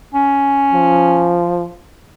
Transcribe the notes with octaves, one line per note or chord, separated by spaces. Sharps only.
C#4
F3